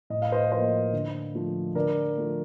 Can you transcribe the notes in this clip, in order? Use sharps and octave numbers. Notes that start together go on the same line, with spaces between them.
A2 D#5
F5
C5 D#5
F3 A#3 C5 D#5
D3
F3 A3
D3 A#4 D5
F3 A3